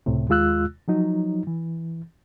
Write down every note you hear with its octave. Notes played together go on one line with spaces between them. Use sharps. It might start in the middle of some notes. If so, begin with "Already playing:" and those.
C#2 A2 C3
D#2 G#3 F4 E6 F#6
F3 F#3 D#4
E3